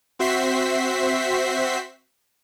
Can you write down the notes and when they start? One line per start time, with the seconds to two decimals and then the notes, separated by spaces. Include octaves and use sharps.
0.19 C4 F#4 C5 E5 B6 C7